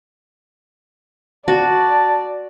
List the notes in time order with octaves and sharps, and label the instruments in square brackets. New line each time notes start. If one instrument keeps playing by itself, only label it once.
[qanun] F#4 [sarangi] D5 [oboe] A5